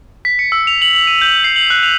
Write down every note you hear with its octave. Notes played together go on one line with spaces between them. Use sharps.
B6
C#7
E6
F7
F#7
F#7
D#7
G6
C7
F#7
F#6
F7